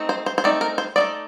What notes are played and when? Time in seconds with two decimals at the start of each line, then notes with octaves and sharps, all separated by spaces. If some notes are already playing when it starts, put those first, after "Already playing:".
Already playing: A3 C4 D#4
0.09 C5
0.26 C5
0.38 C5
0.44 A3 C4 D#4 D5
0.61 A#4
0.78 C5
0.96 C4 D#4 D5
1.00 A3